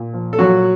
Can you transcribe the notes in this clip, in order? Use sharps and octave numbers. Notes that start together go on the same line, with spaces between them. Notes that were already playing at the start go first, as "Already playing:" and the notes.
Already playing: A#2
F3
A4
A#2 F#3 F#4